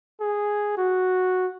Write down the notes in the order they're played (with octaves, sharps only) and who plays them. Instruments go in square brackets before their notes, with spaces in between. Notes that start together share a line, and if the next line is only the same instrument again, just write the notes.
[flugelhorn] G#4
F#4